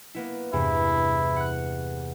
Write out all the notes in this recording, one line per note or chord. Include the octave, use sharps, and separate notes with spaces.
A#3 B3 E4
E2 G2 C3 E4
F#5 F#6